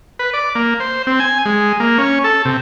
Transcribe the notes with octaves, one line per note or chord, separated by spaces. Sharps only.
B4
D5
A#3
C5
C4
G#5
G#3
A#3
C#4
A4
C3